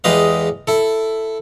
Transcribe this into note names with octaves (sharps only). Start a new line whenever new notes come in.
E2 G#3 G4 B4 D#5 F5
E4 A4